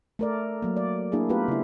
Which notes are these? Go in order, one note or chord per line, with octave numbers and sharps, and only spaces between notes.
A3 A#4 D5
F#3 A#3
D5
A#3 D4 E4 G#4
A3 B3 F4 G4 A#4 B4
C#3 E4